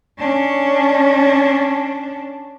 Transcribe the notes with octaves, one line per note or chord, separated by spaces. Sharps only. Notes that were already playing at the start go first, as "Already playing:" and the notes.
C#4 D4